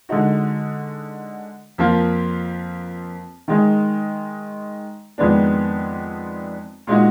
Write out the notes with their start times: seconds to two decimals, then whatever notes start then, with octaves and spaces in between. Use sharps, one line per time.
0.09 D3 G#3 D#4 F#4
1.78 F2 F3 A#3 F4
3.48 D#3 G#3 D#4 G#4
5.18 F2 D#3 G#3 B3 D4
6.87 A#2 G#3 D#4 F#4